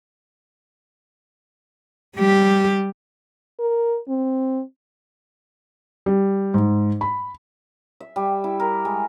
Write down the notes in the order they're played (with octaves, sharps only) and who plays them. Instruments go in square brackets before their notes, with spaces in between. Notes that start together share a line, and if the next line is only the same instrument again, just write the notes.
[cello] G3 G4
[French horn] A#4
C4
[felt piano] G3
G#2
B5
[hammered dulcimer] E5
G3
E4
A#4
G#3